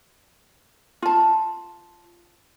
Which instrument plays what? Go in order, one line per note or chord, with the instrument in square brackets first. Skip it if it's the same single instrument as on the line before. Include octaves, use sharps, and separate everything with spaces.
[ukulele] F4 A5